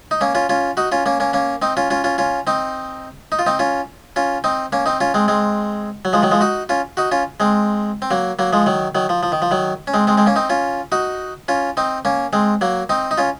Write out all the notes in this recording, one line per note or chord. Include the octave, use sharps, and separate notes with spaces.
D#4
A#3 C#4
C#4 F4
C#4 F4
D#4 F#4
C#4 F4
A#3 C#4
A#3 C#4
A#3 C#4
C4 D#4
C#4 F4
C#4 F4
C#4 F4
C#4 F4
C4 D#4
D#4
F4
C4 D#4
C#4 F4
C#4 F4
C4 D#4
A#3 C#4
C4 D#4
C#4 F4
G#3 C4
G#3 C4
F#3
F3 G#3
D#3 F#3
F3 G#3
D#4 F#4
C#4 F4
D#4 F#4
C#4 F4
G#3 C4
C4
F#3 A#3
F#3 A#3
F3 G#3
D#3 F#3
D#3 F#3
F3
F3
D#3
F3
D#3 F#3
C#4
G#3 C4
G#3 C4
G#3 C4
A#3 C#4
C4 D#4
C#4 F4
D#4 F#4
C#4 F4
C4 D#4
A#3 C#4
G#3 C4
F#3 A#3
C4 D#4
D#4
C#4 F4